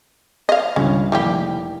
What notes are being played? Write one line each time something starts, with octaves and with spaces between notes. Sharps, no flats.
D#5 F5
C#2 G2 C#4
F1 G3 A#3 E4 G4